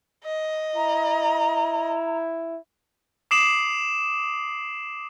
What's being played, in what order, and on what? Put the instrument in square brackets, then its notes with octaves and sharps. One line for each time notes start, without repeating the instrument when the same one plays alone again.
[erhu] D#5
[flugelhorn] E4 [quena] A#5
[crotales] D6 D#6 C7 D7 E7 F#7